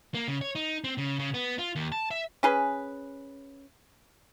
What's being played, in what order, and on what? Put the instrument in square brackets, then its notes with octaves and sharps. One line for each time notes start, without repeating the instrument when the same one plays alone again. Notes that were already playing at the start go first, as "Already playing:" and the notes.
[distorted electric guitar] A#3
C#3
C#5
D#4
C4
C#3
C#3
B3
F4
D#2
A5
E5
[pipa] C#4 G#4 B4